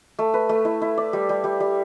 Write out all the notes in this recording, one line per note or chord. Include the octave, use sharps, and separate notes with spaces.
A3
B4
A3
E4
E4
D5
G3
G3
G3
G3